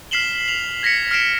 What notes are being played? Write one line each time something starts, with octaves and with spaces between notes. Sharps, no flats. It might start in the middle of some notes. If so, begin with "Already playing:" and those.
F6 B6 C7 E7 F#7 G7
F7 F#7
G#6 A#6 B6 C#7
F6 A#6 C7 D7 E7